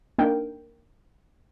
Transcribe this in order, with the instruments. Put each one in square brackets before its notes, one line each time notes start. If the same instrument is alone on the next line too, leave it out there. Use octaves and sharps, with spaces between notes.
[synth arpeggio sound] A#3 D4 D#4 A#4 G5